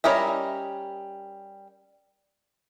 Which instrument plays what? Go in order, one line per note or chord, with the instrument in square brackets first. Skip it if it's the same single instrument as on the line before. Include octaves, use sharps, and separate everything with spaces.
[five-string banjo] G3 C#4 A#4 D#5 E5